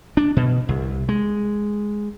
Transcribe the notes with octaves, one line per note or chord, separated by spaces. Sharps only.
D4
B2
C2
G#3